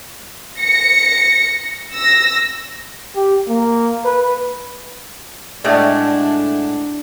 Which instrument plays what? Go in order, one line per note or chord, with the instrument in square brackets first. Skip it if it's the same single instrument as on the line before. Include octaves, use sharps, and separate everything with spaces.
[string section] A#6 C#7
E6 A#6
[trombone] G4
A#3
B4
[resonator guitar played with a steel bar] A2 G#3 A3 [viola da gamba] D4 [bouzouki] D5 F#5